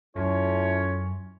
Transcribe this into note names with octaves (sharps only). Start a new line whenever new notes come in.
F#2 A3 C#4 E4 F4 C#5